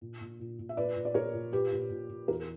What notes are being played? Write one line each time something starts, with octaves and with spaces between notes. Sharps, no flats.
A#2
A#2
A#2
A#2
E5
A#2 B4 D5
A#2
D5
A#2 A#4 C#5
A#2
A#2 G4 B4
A#2
A#2
A#2
E2 F#4 A#4